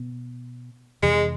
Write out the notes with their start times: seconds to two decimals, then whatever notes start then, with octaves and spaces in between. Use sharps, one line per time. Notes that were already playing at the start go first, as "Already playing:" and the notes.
Already playing: B2 B3
1.03 F2 C3 E3 G#3